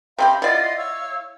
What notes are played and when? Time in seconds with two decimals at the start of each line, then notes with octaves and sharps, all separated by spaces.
0.18 C3 C4 G4 F5 A#5 B5
0.42 E4 F4 D5 D#5 F#5
0.76 C#5 F5 E6